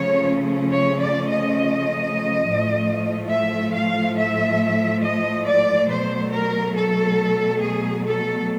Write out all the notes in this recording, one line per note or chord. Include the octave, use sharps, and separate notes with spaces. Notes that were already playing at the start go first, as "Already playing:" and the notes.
Already playing: C#3 F3 A3 C#4 C#5
C#5
D5
D#5
A2 F3 A3
E5
F5
E5
D#5
D5
B2 F#3 A3 C5
A#4
A4
G#4
A4